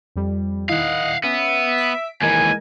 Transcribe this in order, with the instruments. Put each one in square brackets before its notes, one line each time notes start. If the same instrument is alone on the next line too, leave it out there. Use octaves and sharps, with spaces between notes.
[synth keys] F2 G3
[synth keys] D#3 E4 [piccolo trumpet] D#5 [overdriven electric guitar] F5 F#5
[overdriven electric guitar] B3 [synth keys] C#4 [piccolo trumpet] E5
[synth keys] B6 D7
[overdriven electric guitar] D#2 E3 [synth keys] G#3 A#4 D#5 [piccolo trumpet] G#5